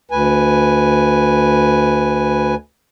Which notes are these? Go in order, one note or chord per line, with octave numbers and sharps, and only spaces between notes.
D2 B4 G#5